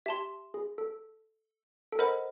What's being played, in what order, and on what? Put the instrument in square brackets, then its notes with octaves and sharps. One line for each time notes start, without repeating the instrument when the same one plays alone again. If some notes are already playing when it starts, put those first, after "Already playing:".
[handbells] G4 [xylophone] E5 A5 C6
[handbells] G#4
A4
A4
[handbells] A#4 [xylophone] C5 D#5 F#5 B5